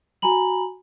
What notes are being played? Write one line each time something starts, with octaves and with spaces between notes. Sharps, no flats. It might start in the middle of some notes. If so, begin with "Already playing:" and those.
F#4 G#5 A#5 B5 F#7